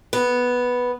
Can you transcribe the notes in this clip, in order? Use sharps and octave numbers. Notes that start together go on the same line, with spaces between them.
B3